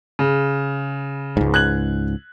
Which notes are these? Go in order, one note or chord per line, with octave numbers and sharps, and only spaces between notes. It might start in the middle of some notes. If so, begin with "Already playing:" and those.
C#3
C#2 G#2
F#6 G#6 F#7